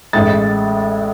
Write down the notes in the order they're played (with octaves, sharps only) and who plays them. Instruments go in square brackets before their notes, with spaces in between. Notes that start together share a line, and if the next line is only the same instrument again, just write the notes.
[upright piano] A1 A2 G#3 A6